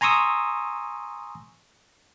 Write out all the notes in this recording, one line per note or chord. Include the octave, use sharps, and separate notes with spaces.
G#5 A#5 C6 C#6 D#6 E6